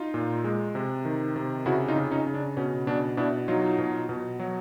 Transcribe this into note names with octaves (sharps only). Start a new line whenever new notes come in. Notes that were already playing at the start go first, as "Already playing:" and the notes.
Already playing: D#4 F4
A#2
G#3
C3
D#3
C3
C#3 E4 F#4
D#4 F4
C#3
C#4 D#4
C#3
D4
B2 C#4
B2 D4
B2 D4 E4
F#3 D#4 F4
B2
B2
F#3